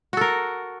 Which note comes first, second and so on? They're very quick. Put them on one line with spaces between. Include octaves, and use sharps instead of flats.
F#4 A4 A#4